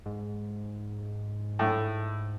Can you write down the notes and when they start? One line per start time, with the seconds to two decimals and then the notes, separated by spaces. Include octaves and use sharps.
0.06 G#2
1.59 A2